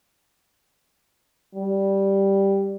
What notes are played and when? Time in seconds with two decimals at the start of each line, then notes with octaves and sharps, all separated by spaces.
1.54 G3